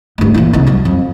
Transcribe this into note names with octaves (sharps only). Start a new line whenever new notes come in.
D2 G2
A#2 E3
C2 D#3
F#3 G3
F2